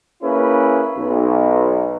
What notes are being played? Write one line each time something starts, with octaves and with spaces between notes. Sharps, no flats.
A#3 C#4 E4 G#4 B4
B1